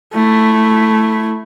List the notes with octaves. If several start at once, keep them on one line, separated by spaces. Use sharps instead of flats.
A3 E4